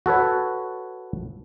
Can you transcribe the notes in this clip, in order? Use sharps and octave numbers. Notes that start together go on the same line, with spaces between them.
F#4 A4 B4 C#5